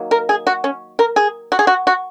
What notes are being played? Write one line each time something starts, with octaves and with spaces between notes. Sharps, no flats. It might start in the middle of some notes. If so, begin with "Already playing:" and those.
Already playing: D#3 F#3 A#3
A#4
G#4
F#4
C#4
A#4
G#4
F#4
G#4
F#4
F#4